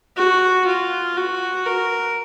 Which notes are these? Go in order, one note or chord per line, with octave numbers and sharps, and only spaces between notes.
F#4
F4
F#4
A#4